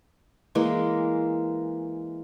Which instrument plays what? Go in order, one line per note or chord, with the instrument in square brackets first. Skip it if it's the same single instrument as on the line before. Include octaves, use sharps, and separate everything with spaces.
[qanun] E3 G#3 A#3